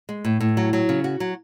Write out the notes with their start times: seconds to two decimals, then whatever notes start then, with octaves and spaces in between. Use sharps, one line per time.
0.09 G#3
0.25 A2
0.41 A2
0.57 F#3
0.73 F#3
0.89 C#3
1.04 F#4
1.20 F#3